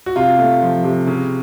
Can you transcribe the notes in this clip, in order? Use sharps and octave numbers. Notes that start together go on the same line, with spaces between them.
F#4
C3 F4
A3
F3
C3
C#3